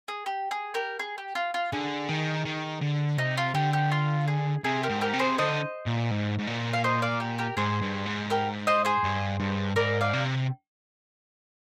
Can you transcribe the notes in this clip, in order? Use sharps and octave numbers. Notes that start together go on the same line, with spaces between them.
G#4
G4
G#4
G4 A#4
G#4
G4
F4
F4
D3 G#4
D#3
D#3
D3
C3 D#4
F4
D3 G4
G4
F4
G#4
C3 G#4
G4 A#4
G#2
G4 A#4
C3
G#4 C5
D3 C5 D#5
A#2
G#2
G#2
A#2
F5
C5 D#5
D5 F5
G4
G4 A#4
G#2 G#4 C5
G2
G#2
G4 A#4
C5 D#5
G#4 C5
G2
G2
G#2 A#4 D5
D5 F5
C3